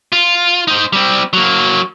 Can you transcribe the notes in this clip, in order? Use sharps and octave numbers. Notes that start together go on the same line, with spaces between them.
F4
D#4 C5
G3 C4
F#3 A#3